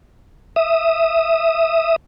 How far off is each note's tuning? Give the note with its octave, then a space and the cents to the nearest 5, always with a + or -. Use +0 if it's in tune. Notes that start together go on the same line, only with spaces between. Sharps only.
E5 +0 D#6 +0